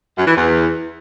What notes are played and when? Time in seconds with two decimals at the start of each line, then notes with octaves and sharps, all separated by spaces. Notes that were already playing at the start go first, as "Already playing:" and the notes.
0.18 F#2
0.27 E3
0.36 E2